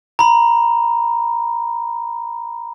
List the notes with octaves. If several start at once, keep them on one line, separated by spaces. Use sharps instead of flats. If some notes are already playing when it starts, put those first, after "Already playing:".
A#5 B5